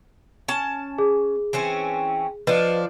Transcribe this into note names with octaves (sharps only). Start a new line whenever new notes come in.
C#4 A5
G#4
E3 C4 C#4
F3 D4 B4 D#5